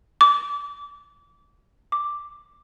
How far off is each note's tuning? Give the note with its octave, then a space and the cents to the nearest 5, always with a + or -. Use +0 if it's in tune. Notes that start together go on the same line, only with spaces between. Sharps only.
D6 -25
D6 +0